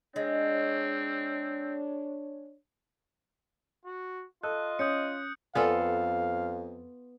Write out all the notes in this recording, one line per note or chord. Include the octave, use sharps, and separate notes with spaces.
G#3 C4 D4 C#5
F#4
F4 A4 D#5 F#6
C#4 D#6 G6 C#7
F2 B3 F4 A4 B4 D5 F5 G#5